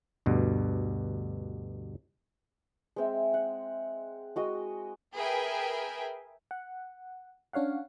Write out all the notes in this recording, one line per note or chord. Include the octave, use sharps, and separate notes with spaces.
D2 G2 B2
G#3 C4 E5
F#5
G#3 F#4 D#5
G#4 A#4 B4 E5 G5 G#5
F#5
C#4 D4 C#5 F5 F#5